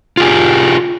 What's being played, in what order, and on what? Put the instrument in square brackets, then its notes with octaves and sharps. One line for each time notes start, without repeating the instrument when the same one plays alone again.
[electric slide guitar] F4 G4 G#4